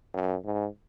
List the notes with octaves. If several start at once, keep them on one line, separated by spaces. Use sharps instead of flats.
F#2
G#2